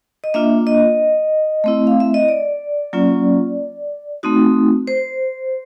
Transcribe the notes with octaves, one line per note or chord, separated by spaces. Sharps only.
D#5
A#3 D4 F4 E5
D#5
A3 C4 E4
F5
E5
D#5
D5
F#3 A#3 C#4 F4
A3 C4 D#4 F#4
C5